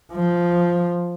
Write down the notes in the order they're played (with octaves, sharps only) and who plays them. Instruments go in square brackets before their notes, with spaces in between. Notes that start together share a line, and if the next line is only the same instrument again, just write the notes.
[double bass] F3